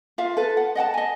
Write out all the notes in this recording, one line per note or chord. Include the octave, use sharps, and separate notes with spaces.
F4 E5 F5
A4 B4
F#5
D#5 F#5 G5 A5
D#5 G#5